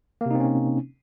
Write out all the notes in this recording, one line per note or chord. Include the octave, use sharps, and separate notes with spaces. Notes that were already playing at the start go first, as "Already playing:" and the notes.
C3 A#3 C4 C#4 D#4